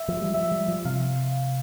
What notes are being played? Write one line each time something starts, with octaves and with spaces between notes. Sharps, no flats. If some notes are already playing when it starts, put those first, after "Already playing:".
Already playing: E5
F3
G3
F3 E5
G3
F3
C3 F5